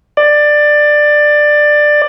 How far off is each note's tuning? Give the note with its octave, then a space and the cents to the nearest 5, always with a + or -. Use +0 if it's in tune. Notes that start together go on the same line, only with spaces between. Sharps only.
D5 +15